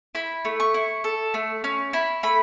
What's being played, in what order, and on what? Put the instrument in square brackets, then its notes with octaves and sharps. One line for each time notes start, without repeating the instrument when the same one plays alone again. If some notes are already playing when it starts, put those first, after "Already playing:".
[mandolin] E4 B5
A3
C#6
E4
A4
A3
C#4
E4 B5
A3 B5